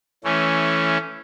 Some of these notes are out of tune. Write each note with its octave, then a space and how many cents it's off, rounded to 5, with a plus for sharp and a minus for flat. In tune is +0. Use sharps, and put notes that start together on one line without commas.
E3 +10 A3 +0 C#4 +0